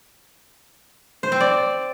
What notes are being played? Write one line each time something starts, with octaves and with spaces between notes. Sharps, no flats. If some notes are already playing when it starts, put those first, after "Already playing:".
C5
C4
D5